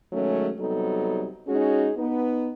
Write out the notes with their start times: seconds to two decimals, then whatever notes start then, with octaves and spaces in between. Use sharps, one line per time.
0.13 D#3 F#3 G#3 A3 C#4
0.60 C3 F#3 G3 B3 D#4 A4
1.48 G#3 C#4 D#4 F#4 G#4
1.97 B3 D#4